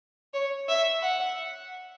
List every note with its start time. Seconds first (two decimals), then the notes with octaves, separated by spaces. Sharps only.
0.34 C#5
0.68 E5
1.03 F#5